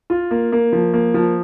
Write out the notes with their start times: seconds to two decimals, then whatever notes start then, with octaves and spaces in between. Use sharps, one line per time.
0.10 F4
0.31 A#3
0.52 A#3
0.73 F3
0.93 A#3
1.14 F3